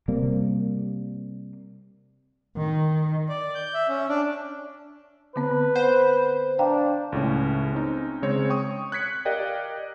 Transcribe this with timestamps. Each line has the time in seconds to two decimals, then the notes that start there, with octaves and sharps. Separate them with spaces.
0.08 C3 G3 A#3
2.56 D#3
3.29 D5
3.55 G6
3.74 E5
3.89 C#4
4.09 D4
5.36 D3 B3 C4 B4
5.75 C5 F#5
6.59 D4 F5 G5 A#5
7.12 C#2 A2 C#4
7.73 C4 C#4 D#4
8.22 C#3 G#3 C4 C#5
8.50 G5 C#6 D#6
8.92 F#6 G#6 B6 C#7
9.25 G4 A#4 D5 D#5 F5 G5